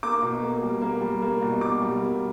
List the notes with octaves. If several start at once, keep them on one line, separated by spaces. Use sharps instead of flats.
A#3 D6
B2
A#3
G3
A#3
G3
A#3
B2
B2 D6
G3
A#3